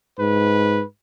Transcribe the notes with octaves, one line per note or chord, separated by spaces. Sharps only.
G#2 B4